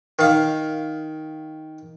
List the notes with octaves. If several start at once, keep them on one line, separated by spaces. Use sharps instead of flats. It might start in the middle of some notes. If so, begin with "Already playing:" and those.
D#3 F5